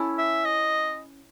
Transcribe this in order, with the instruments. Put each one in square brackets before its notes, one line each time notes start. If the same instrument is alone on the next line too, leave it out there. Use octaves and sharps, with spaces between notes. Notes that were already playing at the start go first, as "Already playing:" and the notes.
Already playing: [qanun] C#4 E4 A4
[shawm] E5
D#5